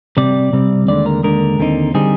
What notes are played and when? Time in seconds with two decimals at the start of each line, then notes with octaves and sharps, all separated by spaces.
0.17 C3 G3 C4 D5
0.53 C3 G3 C4
0.88 D#2 D3 G#3 D5
1.06 A#4
1.23 D#2 D3 G#3 A#4
1.58 D#2 D3 G3 C4 D#4
1.94 D3 G3 C4 D#4 G#4